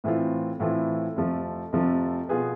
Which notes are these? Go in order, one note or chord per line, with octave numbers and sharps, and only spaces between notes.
A2 E3 A3 C4 F4
A2 E3 A3 C4 F4
F2 C3 F3 A3
F2 C3 F3 A3
B2 B3 F4 G#4 B4